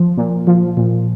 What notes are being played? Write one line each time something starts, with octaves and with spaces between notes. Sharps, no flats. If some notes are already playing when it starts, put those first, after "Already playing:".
Already playing: F3
A#2
F3
A#2